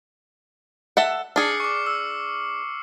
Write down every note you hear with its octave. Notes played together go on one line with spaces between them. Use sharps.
A4 E5 F#5
D4 G#4 F6 C7 C#7
C#6 D6
E6